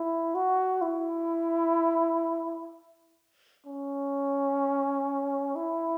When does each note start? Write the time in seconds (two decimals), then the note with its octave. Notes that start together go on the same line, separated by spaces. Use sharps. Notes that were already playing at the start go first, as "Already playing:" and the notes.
Already playing: E4
0.35 F#4
0.82 E4
3.67 C#4
5.56 E4